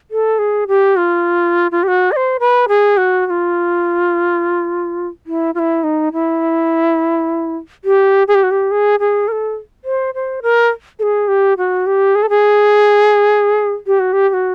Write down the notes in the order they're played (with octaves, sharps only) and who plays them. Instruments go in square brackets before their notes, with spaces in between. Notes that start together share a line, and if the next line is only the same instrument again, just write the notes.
[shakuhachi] A4
G#4
G4
F4
F4
G4
F#4
D#5
C5
B4
G#4
F#4
F#4
F4
E4
F4
E4
D#4
E4
G4
G#4
G4
F#4
G4
G#4
G#4
A#4
A4
C5
C5
A#4
A4
G#4
G4
F#4
G4
G#4
A4
G#4
G4
F#4
G4
G4
F#4